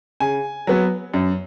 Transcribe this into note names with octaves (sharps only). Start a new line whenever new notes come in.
C#3 G#5
F#3 B3
F#2